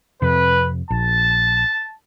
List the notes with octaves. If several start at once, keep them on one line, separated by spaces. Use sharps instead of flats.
F2 C3 B4
A#1 A5